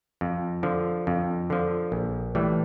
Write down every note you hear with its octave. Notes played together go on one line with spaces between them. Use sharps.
F2
D3 F3
F2
D3 F3
A#1
A2 E3 G3